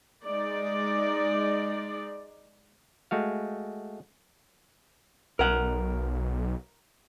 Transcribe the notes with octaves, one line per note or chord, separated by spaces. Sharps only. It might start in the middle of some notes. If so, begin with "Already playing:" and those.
G#3 D#4 D5
G#3 A3 F#4 F5
B1 A#4 F#5